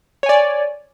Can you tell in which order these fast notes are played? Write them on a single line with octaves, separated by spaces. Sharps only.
C#5 G#5 D5